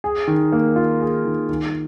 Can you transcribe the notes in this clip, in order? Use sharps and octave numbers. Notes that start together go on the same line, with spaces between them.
G#4
D#3
A#3
F4
G#4
D#3
D#3